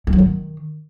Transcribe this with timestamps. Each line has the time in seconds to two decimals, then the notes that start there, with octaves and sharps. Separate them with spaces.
0.07 G#3
0.13 F#3
0.18 D#3